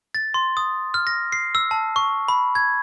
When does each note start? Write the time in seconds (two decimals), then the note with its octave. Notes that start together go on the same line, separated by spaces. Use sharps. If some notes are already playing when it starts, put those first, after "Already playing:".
0.15 A6
0.34 C6
0.57 D#6
0.94 F6
1.07 A#6
1.32 C7
1.55 E6
1.71 A5
1.96 C#6
2.28 B5
2.55 G#6